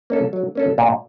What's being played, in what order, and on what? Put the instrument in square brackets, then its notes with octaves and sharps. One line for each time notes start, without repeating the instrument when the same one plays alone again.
[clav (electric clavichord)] A#3 C#4 A4
F#3
A#3 C#4 A4
A#2